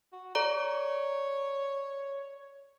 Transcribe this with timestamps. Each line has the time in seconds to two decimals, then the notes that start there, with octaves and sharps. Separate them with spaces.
0.13 F#4
0.35 A4 C#5 D5 A#5